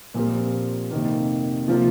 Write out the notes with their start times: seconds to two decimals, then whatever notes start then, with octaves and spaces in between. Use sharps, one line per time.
0.14 A#2 F3 C4 G4 A#4
0.91 F2 C3 D#3 A#3
1.68 C3 F3 A#3 F4